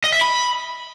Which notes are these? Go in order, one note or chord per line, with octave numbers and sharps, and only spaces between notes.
D#5
E5
B5